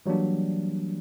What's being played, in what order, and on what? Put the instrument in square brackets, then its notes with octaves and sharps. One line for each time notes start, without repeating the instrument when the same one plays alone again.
[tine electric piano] E3 F#3 G3 A#3 D4